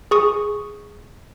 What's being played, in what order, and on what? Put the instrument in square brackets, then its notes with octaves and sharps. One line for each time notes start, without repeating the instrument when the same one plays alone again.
[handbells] G#4 C#6 D#6